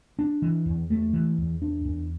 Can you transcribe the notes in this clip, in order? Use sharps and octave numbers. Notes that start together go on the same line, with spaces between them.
D4
E3
E2
A3
E3
E2
D4
E2